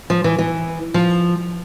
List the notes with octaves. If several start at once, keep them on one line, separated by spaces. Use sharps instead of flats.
F3
E3
E3
F3